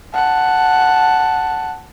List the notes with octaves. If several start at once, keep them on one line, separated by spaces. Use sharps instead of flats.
F#5 A5